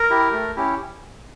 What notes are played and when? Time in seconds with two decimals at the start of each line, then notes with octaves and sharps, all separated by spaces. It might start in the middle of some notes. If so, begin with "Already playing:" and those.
Already playing: A#4
0.10 E4 G4
0.33 A3
0.56 C#4 E4 G4